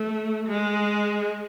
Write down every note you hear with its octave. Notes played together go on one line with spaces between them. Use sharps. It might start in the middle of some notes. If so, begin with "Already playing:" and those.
Already playing: A3
G#3